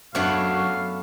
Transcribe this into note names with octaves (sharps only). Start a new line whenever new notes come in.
F#2 A3 B3 D4 F#4 C#5 F5 F#5